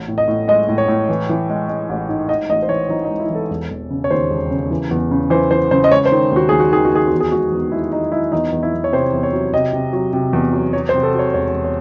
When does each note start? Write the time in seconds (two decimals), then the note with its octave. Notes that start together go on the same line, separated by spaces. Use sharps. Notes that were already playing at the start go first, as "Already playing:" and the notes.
Already playing: A1
0.08 A2
0.18 D#5
0.28 A2
0.48 G#3 D#5
0.68 A2
0.78 C#5
0.88 A2
1.09 E3
1.29 E3
1.49 G#3
1.68 G#3
1.89 A1
2.09 G#2
2.29 G#2 D#5
2.50 A1 D#5
2.63 C5
2.69 E3 C#5
2.89 E3 D#4
3.05 D#4
3.10 G#3
3.20 E4
3.30 E3
3.35 A4
3.50 E1
3.70 E1
3.90 C#3
4.04 C#5
4.10 D#2 C5
4.30 E1
4.51 C#3
4.70 E3
4.91 E2
5.11 C#3
5.30 E3 C5
5.51 E3 C5
5.71 C#3 C5
5.84 D#5
5.91 G#3 C#5
6.06 C5
6.12 D#3
6.32 D#2 F#4
6.49 D#2 G#4
6.60 F#4
6.72 D#3 G#4
6.85 F#4
6.92 D#2 G#4
7.07 E2 F#4
7.20 G#4
7.32 G#3 F#4
7.52 E2
7.72 G#3 E4
7.92 G#3 D#4
8.12 G#3 E4
8.32 E2 D#4
8.52 E2
8.63 E4
8.73 E2
8.84 C#5
8.92 C3 C5
9.13 E2
9.23 C#5
9.33 F#3
9.53 C3 D#5
9.73 C3
9.93 F#3
10.13 C3
10.33 E2
10.53 F#3
10.73 F#3 C#5
10.89 C5
10.94 C3
11.03 A4
11.14 F#3 C#5
11.34 E1 C#5
11.54 E1
11.64 C#5